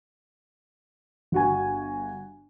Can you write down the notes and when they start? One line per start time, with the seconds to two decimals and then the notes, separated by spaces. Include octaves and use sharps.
1.32 G1 F#4 G#5